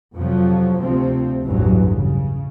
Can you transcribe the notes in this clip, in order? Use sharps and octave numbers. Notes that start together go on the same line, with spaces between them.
F2 C3 F3 F#3
D2 C3 F3 C4
A1 E2 G2 E3 F#3
C#3